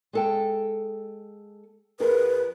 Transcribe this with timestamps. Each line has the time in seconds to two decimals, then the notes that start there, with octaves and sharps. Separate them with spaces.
0.13 G#3 A4 G5
2.00 F2 G#4 A#4 B4